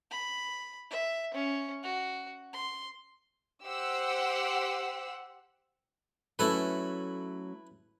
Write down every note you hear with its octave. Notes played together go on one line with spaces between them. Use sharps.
B5
E5
C#4
F#4
C6
G4 C5 F#5 E6
F#3 A3 C#4 E4 A4 B4